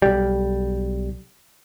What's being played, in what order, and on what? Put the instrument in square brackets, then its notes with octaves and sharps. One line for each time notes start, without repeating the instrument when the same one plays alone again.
[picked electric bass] B1 G3